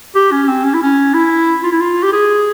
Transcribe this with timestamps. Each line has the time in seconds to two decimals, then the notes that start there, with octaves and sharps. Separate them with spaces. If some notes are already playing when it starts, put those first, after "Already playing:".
0.15 G4
0.32 C#4
0.48 C4
0.64 C#4
0.74 E4
0.83 C#4
1.14 E4
1.63 F4
1.72 E4
1.81 F4
2.03 G4
2.12 G#4